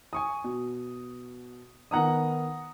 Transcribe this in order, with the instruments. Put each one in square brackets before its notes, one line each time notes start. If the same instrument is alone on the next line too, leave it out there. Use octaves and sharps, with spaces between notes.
[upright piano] G#5 C#6 D#6
B2
[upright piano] D#3 B3 D#4 [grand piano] F#5 A#5 D#6